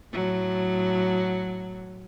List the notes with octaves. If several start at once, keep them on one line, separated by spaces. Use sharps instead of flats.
A2 F#3